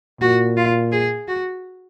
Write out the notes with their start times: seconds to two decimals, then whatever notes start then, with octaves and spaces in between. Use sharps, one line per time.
0.21 A#2 F#4
0.57 F4
0.92 G#4
1.28 F#4